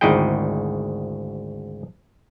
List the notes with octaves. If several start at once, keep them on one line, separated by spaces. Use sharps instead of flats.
G#1 D2 D#4 E4 G#4 G5